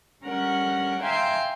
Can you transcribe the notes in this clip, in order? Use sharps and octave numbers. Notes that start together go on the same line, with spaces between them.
G3 C#4 A#4 F#5
E5 F5 G5 G#5 A#5 C6